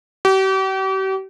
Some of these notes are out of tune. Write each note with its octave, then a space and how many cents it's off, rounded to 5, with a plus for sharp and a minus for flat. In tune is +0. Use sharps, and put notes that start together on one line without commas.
G4 -40